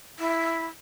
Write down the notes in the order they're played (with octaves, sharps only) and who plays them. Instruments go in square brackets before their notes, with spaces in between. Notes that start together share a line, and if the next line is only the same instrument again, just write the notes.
[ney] E4